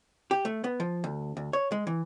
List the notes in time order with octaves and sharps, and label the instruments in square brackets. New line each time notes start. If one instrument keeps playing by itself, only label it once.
[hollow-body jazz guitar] G4
A3
B3
F3
D2
D2
C#5
G#3
E3